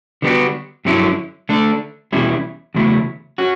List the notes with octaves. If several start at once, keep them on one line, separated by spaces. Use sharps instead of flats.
D3 G3 B3 D4 F#4
G2 D3 F#3 C#4 E4
D3 A3 D4
E2 B2 G3 C#4 E4
E2 C#3 F#3 A3 E4
C#4 F#4